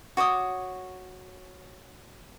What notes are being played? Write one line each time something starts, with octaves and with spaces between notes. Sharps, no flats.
F#4 C#5 D6 D#6